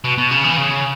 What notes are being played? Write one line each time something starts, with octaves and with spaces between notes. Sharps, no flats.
B2
B2
C#3
E3
C#3